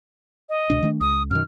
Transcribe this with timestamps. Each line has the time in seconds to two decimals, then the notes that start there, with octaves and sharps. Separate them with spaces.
0.49 D#5
0.70 C#2 B2 D4
0.83 D#3 A3 D4
1.01 C#2 D#6
1.31 F#2 B2 D#3 F6